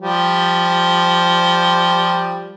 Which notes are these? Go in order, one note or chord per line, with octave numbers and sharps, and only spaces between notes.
F3 G3